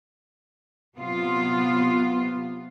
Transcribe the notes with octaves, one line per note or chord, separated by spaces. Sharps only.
C3 F#3 B3 F4